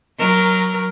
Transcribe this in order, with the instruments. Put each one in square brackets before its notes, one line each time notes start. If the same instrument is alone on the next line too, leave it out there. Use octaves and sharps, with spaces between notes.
[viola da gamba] F#3 A#4